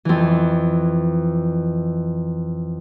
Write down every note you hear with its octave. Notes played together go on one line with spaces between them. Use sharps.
F2 E3